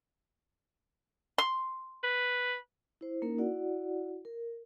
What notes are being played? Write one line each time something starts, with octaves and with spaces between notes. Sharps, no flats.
C6
B4
E4 C5
A#3 C#4 D#4 A#4
E4 F#4 D5 F#5
A#4